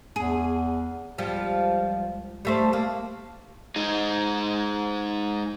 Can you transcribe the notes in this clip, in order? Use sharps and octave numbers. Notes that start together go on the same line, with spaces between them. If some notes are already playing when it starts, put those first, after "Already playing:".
E2 G#4
C#2 F3 G3
G3 A3 C5
A#3
G#3 D#4